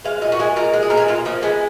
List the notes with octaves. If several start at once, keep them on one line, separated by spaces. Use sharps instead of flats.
G#3 F5
A#2 D#5
F#4
G#3 G#4
A#2 A#4
G#3
G#4
A#2 A#4
G#4
A#2 F4
F3 A#3
G#3 B3